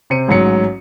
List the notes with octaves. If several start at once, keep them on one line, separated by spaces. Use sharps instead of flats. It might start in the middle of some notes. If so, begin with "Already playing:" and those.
C3 C5 C#7 D#7
A1 G#2 F#3 C#7